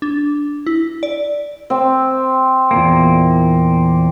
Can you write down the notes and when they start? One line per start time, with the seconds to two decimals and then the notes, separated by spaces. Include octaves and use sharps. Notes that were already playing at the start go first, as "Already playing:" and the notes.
0.02 D4
0.66 E4
1.03 D5
1.70 C4
2.71 E2 A#2 A#3